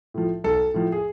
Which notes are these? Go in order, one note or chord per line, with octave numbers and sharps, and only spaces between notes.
A2 F3
B1 A4
A2 F3
G#4